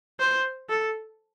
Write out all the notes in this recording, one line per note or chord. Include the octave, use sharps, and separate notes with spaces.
C5
A4